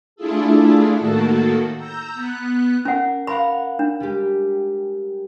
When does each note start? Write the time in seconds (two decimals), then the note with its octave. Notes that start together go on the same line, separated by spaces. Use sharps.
0.16 A3 D4 E4 F4 G#4 A4
0.96 A2 D#3 A#3 F#4 A4 A5
1.77 A#5 E6 G6
2.14 B3 F#6
2.85 C#4 A#4 F#5
3.27 A#4 F5 F#5 B5
3.79 D4
4.00 G3 G#3 G4